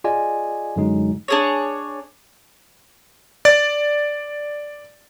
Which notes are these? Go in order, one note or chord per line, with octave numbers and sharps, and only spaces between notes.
F4 G#4 D5 D#5 G#5
F#2 D3 F#3 G#3 D#4
D4 G#4 C#5
D5 A6